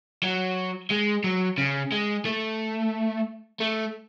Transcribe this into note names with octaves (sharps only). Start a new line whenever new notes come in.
F#3
G#3
F#3
C#3
G#3
A3
A3